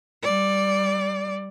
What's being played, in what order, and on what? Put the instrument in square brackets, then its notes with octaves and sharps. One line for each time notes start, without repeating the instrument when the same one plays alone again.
[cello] G3 D5